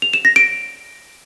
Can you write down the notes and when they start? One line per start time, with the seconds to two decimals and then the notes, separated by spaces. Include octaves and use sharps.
0.02 F7
0.13 E7
0.25 A#6
0.36 D7